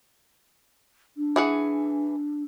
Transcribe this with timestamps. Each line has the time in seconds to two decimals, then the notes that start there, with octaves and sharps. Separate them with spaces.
1.17 D4
1.36 E3 G#4 F#5